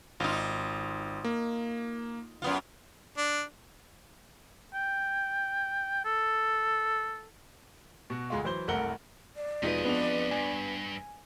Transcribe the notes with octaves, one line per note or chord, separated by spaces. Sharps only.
G#1 D#4 F4
A#3
F#2 B3 F4
D4
G5
A4
B2 F#4
D2 G#3 F4
E3 F#3 C5 G7
F#1 C2 A3 A#4 F#5 G7
D5
E1 F2 D#4 F4 G#4 B4 D#5 B6
B3 D4 F7
D2 G2 G#5